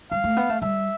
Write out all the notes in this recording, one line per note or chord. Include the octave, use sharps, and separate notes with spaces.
G3 F5
A3
B3
A3
G3 E5